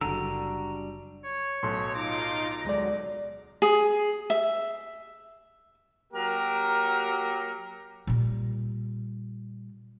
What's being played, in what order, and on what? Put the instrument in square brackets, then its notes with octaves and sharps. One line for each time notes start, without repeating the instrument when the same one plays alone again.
[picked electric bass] F#1 D3 [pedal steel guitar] G3 D4 E6 [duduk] F#4 [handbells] A#5
[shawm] C#5
[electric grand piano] B1 A4 C6 [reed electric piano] A2
[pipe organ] D#4 F4 D6 [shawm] A#5
[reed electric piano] D2 G#3 D5 [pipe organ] F#3
[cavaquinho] G#4
E5
[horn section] F#3 A#3 G4 A#4
[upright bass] A#2 G3